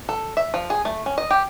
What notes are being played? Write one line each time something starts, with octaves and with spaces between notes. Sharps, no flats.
A4
E5
F3
G#4
A3
C#4
D#5
G4